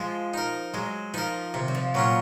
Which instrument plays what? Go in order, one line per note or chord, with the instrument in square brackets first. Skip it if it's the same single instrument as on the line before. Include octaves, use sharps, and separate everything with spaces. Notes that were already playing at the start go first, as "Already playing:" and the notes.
Already playing: [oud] F3 [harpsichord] G#3
[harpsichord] D#4 A#4
[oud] F#3 [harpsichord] G#3
[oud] F3 [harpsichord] D#4 A#4
[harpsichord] C3 [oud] D#3
[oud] F#3
F3
[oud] A#2 [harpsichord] F#3 C#4 F4